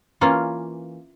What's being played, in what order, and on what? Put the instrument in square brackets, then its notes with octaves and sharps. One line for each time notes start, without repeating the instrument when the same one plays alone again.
[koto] E3 A#3 C#4 F4